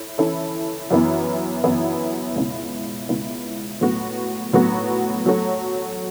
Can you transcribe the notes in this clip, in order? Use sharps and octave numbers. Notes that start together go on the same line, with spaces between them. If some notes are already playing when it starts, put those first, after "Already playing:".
Already playing: E4 A4 C#5
E3 C#4 E4 A4 C#5
F#2 E3 B3 E4
F#2 E3 B3 E4
C#2 B2 B3 E4
C#2 B2 B3 E4
A2 F#3 B3 F#4
A2 F#3 B3 F#4
F#3 A3 F#4 C#5